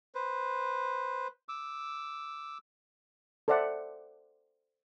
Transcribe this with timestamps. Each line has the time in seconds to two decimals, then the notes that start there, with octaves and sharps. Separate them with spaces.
0.15 B4 C5
1.49 D6 E6
3.48 A4 C5 D5 E5 F#5